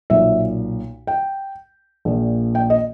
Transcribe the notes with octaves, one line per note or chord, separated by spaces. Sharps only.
B1 A#2 E5
G5
A#1 A#2
G5
D#5